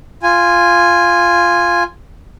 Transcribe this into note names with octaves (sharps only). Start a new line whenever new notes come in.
F4 G#5